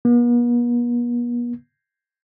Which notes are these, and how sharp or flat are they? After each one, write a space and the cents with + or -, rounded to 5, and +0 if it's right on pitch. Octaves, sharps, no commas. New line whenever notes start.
B3 -45